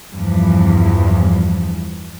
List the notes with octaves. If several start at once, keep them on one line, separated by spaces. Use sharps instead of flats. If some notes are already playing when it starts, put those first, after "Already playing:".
E2 G2 E3 F3